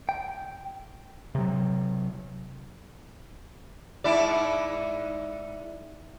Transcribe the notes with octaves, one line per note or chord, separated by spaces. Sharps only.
G5
C3 F#3
G#2 E4 D5